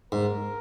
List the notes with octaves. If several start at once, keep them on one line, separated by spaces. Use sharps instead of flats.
G#2 A#4